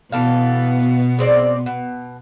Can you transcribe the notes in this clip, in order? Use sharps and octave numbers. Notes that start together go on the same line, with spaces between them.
B2 E3 B3 A4 F5
G#3 C4 D5
B2